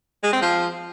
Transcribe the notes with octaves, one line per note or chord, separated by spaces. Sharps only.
G#3
C4
F3